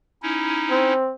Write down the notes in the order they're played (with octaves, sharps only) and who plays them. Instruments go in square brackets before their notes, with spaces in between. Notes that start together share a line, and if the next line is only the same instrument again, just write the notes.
[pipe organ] C#4 D#4 E4
[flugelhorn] C4